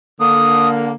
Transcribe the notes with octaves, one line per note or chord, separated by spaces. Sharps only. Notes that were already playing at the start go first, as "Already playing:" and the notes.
D3 A#3 D#6